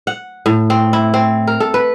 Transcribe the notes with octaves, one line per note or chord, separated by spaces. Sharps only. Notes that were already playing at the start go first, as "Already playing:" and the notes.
F#5
A2
C4
E4
C4
A#4
A4
B4